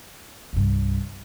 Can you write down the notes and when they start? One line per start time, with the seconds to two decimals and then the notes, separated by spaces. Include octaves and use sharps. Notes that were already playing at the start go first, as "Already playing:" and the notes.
0.53 C2 G2